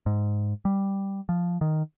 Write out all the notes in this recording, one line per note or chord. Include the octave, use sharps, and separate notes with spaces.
G#2
G3
F3
D#3